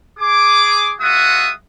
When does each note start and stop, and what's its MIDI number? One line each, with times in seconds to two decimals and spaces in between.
0.19 0.94 68
0.19 0.94 86
1.01 1.51 56
1.01 1.51 65
1.01 1.51 66
1.01 1.51 76
1.01 1.51 78
1.01 1.51 87